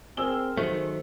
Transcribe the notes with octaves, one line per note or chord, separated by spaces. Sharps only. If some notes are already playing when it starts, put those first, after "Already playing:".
C4 G#4 A#4 E6 G7
D#3 F#3 A3 C5